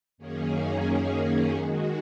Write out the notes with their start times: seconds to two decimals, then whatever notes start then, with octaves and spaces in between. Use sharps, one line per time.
0.18 F#2 D#3 A#3 C#4 G#4
1.54 D#3 G#3 F#4